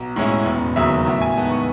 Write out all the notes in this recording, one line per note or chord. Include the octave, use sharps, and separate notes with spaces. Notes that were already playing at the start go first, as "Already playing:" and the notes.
Already playing: B1
A2 G#3 C#4 E4
E1
D#2 C#3 F#3 E5
A2 E5
G#5
E3 G#3 B3 D#4 A5
C#6